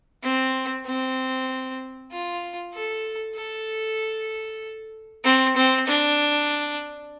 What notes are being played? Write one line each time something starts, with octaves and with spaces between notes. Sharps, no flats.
C4
C4
F4
A4
A4
C4
C4
D4